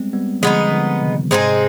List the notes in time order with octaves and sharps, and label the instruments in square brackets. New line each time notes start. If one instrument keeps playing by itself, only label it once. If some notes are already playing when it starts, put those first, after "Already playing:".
Already playing: [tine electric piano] G3 G#3 B3 C4
G3 B3
[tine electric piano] D3 F3 [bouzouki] G#3 B3 D#4
[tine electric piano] D3 F3
C3 D#3
[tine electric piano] G#2 C3 [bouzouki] G#3 C4 D#4 G#4